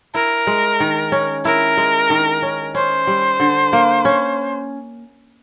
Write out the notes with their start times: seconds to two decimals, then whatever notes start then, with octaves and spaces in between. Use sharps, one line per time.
0.14 E4 A#4
0.47 G#3
0.80 D#3
1.12 C#4
1.45 E4 A#4
1.77 G#3
2.10 D#3
2.42 C#4
2.75 C#4 C5
3.07 G3
3.40 D3
3.73 A#3
4.05 C#4